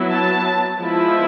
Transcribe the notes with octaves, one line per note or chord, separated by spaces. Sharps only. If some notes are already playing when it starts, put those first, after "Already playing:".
Already playing: F#3 B3 E4
A5
F3 G#3 B3 E4